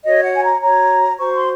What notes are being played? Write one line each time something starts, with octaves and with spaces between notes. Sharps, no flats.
F#4 C#5 D#5
F#5
G#5
A#5
F#4 C#5 A#5
F#4 C5 C#6
C6